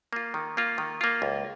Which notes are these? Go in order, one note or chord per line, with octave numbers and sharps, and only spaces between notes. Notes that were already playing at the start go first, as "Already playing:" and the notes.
A#3 F4
D#3
A#3 F4
D#3
A#3 F4
C#2